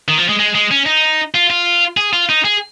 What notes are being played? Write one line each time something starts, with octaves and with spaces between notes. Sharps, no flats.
D#3
F3
G#3
G#3
G#3
C#4
D#4
F4
F4
G#4
F4
D#4
G#4